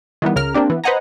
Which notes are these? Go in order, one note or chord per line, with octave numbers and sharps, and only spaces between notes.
D#3 E3 G3 B3
C#2 C#3 A#4 F6
A#3 C4 D4 G4
E3 B3
B4 C5 D#5 F#5 G#5 A#5